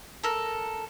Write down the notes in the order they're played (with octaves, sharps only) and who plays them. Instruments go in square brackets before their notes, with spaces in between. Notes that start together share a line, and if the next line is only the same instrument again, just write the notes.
[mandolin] A4 A#4